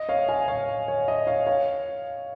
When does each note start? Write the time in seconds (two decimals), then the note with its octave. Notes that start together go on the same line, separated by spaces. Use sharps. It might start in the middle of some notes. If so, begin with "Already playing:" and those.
Already playing: D#5
0.09 C#5 F5
0.29 F5 G#5
0.48 C#5 F5
0.88 C#5
1.08 D#5
1.27 C#5 F5
1.47 C#5 F5